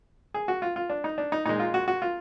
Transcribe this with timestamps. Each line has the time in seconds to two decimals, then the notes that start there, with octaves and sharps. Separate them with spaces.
0.34 G#4
0.48 F#4
0.62 F4
0.76 F4
0.90 D4
1.04 D#4
1.18 D4
1.32 D#4
1.46 A#2 G#3 D#4
1.60 F4
1.74 F#4
1.88 F#4
2.02 F4